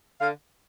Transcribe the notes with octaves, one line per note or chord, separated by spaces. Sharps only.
D3 F5